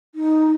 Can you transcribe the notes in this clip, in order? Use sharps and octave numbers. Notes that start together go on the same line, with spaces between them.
D#4